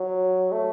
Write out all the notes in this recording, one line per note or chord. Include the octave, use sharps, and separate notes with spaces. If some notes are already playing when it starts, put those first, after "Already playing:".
Already playing: F#3
A3